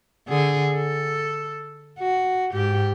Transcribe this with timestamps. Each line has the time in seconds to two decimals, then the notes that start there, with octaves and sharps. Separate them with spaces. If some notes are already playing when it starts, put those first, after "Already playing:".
0.28 D3 G#4
0.73 A4
1.98 F#4
2.53 G#2 G4